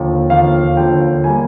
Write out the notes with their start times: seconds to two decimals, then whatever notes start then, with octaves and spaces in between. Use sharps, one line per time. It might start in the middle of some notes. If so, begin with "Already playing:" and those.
Already playing: D#2 D3 F3
0.30 D#2 D3 F3 F5
0.77 D#2 D3 F3 G5
1.24 G3 A#3 G#5